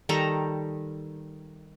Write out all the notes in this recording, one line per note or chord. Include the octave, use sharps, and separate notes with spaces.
D#3 G3 A4 A#5